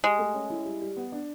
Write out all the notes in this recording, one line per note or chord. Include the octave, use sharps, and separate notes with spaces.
G#3 G4
A3
C#4
E4
G3
G3
B3
D4